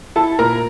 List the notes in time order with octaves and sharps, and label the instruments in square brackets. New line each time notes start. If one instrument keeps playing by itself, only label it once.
[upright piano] E4 A4 A5
A#2 A#4 A#5